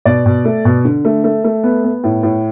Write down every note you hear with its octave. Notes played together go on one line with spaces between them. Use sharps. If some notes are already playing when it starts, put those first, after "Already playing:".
B2 D5
B2
A3
B2
D3
A3
A3
A3
B3
B3
A2
A2